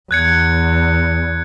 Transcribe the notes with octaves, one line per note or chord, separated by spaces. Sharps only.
E2 F#6 G#6 C#7